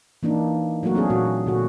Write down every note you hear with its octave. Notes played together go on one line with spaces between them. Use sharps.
E3 A#3 D4 D#4
F#3 A3 A#3 F#4 A#4
C4 D4 G#4
A#2 F#4
A#2 D3 F#4